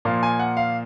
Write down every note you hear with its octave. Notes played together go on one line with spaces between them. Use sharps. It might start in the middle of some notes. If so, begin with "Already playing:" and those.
A#2 F3 A#3 F5
G#5
F#5
F5